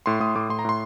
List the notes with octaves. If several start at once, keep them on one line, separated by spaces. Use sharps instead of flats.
A2 C6
A2 D#6
A2 D6
A2 C6
A#5
A2 C6